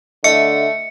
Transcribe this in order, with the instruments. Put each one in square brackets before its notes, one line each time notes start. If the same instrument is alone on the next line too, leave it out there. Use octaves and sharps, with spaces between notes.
[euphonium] D3 [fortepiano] A3 [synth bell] D#5 E5 [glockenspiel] C#7